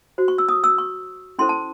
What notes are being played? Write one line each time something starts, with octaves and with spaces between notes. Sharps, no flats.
F#4 C5
C#6
E6
D#6
E6
C#6
C#4 E4 A4 C5 C6
A5